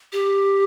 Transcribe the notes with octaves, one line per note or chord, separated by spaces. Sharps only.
G4